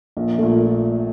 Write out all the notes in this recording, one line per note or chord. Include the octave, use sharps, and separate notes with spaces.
A#1
A#2 A3